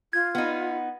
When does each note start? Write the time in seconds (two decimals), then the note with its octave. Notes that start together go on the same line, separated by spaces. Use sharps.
0.13 F4 G#6
0.35 B3 D#4